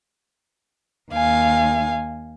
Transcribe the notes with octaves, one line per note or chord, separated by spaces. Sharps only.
D#2 F5 G#5